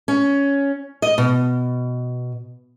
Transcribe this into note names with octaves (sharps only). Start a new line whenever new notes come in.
C#4
D#5
B2